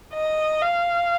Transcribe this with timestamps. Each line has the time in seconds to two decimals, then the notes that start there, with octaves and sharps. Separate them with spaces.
0.14 D#5
0.62 F5